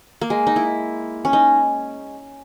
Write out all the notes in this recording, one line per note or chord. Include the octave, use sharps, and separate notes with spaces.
A#3
G#3
D#4
E4
C#4
D#4